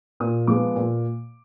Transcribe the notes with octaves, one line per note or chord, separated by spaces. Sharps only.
A#2 D#6
F3 G#3 B3 D6
A#2